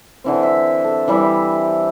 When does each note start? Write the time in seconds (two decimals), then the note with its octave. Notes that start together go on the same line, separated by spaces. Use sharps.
0.24 D3 E3 C4
0.43 E5
0.84 A4
1.08 E3 G3 E4 E5